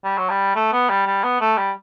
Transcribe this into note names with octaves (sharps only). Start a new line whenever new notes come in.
G3
F#3
G3
A3
B3
G3
G3
B3
A3
G3